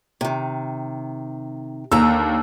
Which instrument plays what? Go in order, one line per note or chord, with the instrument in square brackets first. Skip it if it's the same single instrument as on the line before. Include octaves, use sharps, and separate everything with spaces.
[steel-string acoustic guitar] C3 D#3
[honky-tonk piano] D#2 E6 [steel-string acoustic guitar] D3 A#5